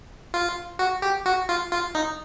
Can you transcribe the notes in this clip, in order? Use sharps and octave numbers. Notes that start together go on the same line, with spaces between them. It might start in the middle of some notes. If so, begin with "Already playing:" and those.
F4
F#4
G4
F#4
F4
F4
D#4